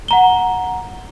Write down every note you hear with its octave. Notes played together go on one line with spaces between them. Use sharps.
F#5 A#5 G7